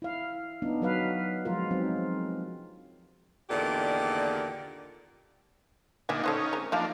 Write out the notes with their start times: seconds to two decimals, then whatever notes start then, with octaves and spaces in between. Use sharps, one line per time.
0.02 E4 F5
0.62 B3 D4 D#4
0.82 F#3 B4 F5
1.45 F3 F#3 G#3 F4 A#4
1.71 F#3 C4 D#4
3.50 E2 A#2 D3 D#3 G4 D5
6.09 A#2 D3 D#4 E5 G5 G#5
6.24 C#4 D#4 A4 C5 F#5
6.53 G#3 C4 A#4
6.72 F3 A#3 D4 D#4 F5 A5